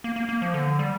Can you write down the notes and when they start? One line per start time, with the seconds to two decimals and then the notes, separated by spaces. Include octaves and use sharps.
0.04 A#3
0.16 A#3
0.29 A#3
0.42 F3
0.54 D3
0.79 G3